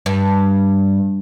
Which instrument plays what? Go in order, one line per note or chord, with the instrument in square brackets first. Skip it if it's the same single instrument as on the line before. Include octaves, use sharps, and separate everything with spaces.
[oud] G2